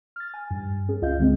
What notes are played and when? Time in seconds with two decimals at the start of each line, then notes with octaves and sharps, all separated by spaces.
0.16 F6 A6
0.34 G#5
0.51 G2
0.89 C#4 G#4
1.02 C#2 F4 D#5 F5 G6
1.20 D3 G#3 C4